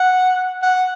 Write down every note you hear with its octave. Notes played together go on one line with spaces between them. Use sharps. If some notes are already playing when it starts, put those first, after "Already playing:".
Already playing: F#5
F#5